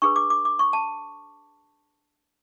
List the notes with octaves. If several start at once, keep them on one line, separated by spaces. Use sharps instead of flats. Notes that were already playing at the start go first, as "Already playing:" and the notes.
D4 G#4 B4 C#6
D6
D6
D6
C#6
A5